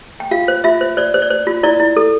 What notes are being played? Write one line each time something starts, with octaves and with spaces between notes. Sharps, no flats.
G5
F4 F5
C5
F4 E5
C5
C5 D5
C5
D5
C5
F4
E4 D5
E4
A4